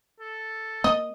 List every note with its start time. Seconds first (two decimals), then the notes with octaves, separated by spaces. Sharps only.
0.21 A4
0.84 A#3 D#5